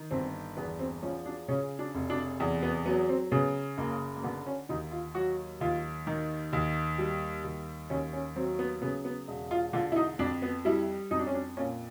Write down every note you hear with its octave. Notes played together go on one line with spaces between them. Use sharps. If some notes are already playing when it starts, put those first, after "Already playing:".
Already playing: D#3
G1 C4
E2 B3
C4
F3 C#4
D4
C#3 C#4
D4
F1
D4
E2
B3
F#3 B3
C4
C#3 B3
F#1 A#3
A#3
D3 B3
C#4
D#2 D#4
F4
F#3 F#4
D#2 F4
D#3
D#2
G3
D#2
D#2 C#4
C#4
F#3 C4
B3
C#3 B3
B3
E1
F4
D3 F4
E4
D#4
F2 D4
B3
G3 E4
F2 D#4
D4
C#4
D4
A#2 C#4